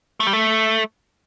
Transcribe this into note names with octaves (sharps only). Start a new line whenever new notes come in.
A3
G3
A3